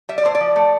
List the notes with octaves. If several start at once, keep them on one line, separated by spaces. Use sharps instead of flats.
G3 E5
D5
A2 C5
D5
F3
A3